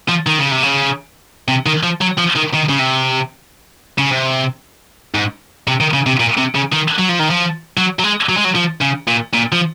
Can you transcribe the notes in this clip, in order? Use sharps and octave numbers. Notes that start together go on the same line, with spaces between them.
F3
D#3
C#3
C3
C#3
C3
D#3
F3
F#3
F3
D#3
D#3
C#3
C3
C#3
C3
G#2
C3
D#3
C#3
C3
A#2
C3
C#3
D#3
F#3
F3
D#3
F3
F#3
F#3
G#3
F#3
G#3
F#3
F3
C#3
A#2
A#2
F3